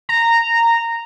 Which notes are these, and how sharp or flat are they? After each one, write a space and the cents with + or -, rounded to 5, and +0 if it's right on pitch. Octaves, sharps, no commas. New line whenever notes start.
A#5 -10